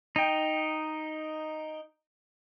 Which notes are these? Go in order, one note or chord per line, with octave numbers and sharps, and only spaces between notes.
D#4 G5